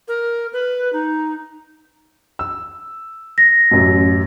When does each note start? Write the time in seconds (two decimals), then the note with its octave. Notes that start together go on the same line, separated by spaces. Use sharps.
0.08 A#4
0.53 B4
0.93 D#4
2.39 E6
3.38 A#6
3.71 A1 F#2